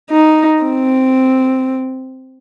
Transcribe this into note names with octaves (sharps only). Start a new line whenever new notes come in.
D#4
C4